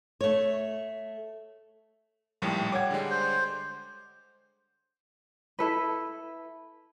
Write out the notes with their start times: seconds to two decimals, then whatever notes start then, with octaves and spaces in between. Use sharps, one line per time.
0.21 A3 C#5
2.42 A#1 D#2 A2 G3
2.72 C#5 F#5 G5 D6 G#6
2.90 D3 G3 G#3
3.10 C5
5.59 E4 A4 B4